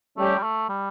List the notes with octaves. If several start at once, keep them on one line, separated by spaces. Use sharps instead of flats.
G3 A3 C#4 G4
G3
A3
G3